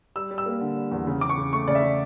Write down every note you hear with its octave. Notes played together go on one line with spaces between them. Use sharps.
G3 E6
G3
E6
A#3
D3
G3
E2
C#3
C#3 D6
C#6
C#3
A3 C#6
C#3 D5
E5
C#3